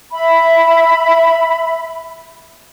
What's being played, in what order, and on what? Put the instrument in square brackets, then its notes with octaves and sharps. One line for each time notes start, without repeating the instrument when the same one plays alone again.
[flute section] E5 B5